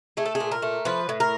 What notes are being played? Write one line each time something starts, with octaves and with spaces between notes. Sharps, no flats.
A3 G#4
A4
G#4
A#2
A#4
A3
F3 B4
A2
A#4